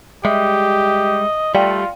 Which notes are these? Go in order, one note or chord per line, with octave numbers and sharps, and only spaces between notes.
G3 G#3 G4 D#5 E5
G3 A3 F4 D5 F5 G5